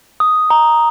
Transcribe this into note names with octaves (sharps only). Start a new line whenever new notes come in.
D#6
A#5